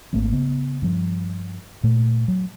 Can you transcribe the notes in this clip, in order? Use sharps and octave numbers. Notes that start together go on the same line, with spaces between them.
G#1 A3 A#3 C4
C#3 B3
G2 F3
A#2 A3
F#3